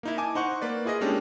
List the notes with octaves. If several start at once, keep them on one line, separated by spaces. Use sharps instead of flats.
A#3 D#4 E4
D#5 G#5 A5 D6
D#4 C5 F#5 C#6
A#3 B4 D5
E4 F4 G#4 A#4 D#5
G#3 A#3 C#4 D4 G4 A4